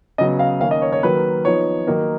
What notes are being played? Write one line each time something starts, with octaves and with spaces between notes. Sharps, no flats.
C#3 F#3 B3 D#5
F5
D#3 A#3 C#4 F5
D#5
C#5
C#5
D#3 F#3 A#3 B4
F3 B3 D#4 C#5
D#3 F#3 A#3 D#4